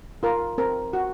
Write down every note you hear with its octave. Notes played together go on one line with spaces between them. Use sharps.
F4 A#4
C4 A#4
F#4